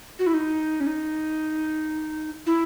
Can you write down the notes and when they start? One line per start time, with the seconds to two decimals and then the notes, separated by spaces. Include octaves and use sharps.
0.19 F#4
0.27 E4
0.34 D#4
0.80 C#4
0.87 D#4
2.46 E4